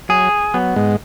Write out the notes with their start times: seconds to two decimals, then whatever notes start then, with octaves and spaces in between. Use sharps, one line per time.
0.09 F#3 G#4
0.54 F#3 B3
0.76 G#2 G#3